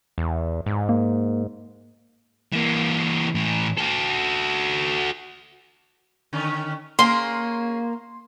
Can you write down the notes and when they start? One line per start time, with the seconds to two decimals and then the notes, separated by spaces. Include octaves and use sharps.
0.18 E2
0.66 G#2
0.89 A#3
2.53 E3 A#3
3.35 A2 E3
3.78 F#4 A4
6.33 D3 D#3 C#4
6.99 A#3 C#4 G#4 A#4 C6